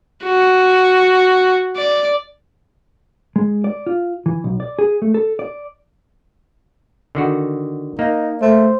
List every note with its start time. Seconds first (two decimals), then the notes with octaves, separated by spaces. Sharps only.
0.24 F#4
1.77 D5
3.36 G#3
3.64 D5
3.87 F4
4.26 E3
4.44 B1
4.60 D5
4.79 G#4
5.02 A3
5.14 A4
5.39 D5
7.15 D3 D#3 F#4
7.99 A#3 D#4
8.42 A3 C5